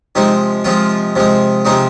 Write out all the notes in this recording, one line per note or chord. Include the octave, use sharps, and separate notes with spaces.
C3 F3 G#3 D#4
C3 F3 G#3 F4
C3 F3 G#3
C3 F3 G#3 D#4